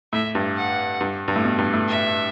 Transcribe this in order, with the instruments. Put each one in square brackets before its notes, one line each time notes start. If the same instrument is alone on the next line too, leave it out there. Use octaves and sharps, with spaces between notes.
[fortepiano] A2 [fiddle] E5
[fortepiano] G2
[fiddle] F#5
[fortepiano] G2
G2
A2
B2
G2
A2
[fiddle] E5